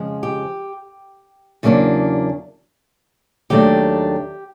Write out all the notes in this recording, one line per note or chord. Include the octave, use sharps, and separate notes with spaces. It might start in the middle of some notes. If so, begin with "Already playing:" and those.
Already playing: F2 C#3 F3 G#3
G4
E2 C#3 F#3 A#3 D4
D#2 D#3 F#3 A3 D4 G4